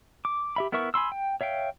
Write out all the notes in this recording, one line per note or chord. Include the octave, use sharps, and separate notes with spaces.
D6
G4 E5 B5
B3 E4 A#4 E5 C#6
G#5 B5 C6 E6
G5
C#5 E5 F5 G5